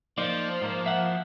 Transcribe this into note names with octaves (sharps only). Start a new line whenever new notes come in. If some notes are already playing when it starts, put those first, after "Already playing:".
F3 A#3 D#4 C5 D5
G#2 A#3
E5 F#5